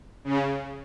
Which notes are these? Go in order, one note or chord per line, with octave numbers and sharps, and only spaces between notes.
C#3